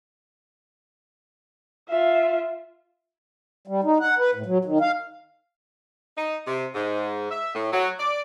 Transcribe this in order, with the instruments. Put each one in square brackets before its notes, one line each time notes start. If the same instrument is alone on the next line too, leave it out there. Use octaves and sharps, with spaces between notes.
[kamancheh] F4 E5
[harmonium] G3
D#4
F#5
B4
A2
F#3
D#3
F5
[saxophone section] D#4
C3
G#2
E5
A2
F#3
D5